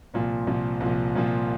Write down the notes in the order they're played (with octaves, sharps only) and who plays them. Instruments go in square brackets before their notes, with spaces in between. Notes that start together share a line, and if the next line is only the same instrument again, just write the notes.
[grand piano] C2 A#2 F3
C2 A#2 F3
C2 A#2 F3
C2 A#2 F3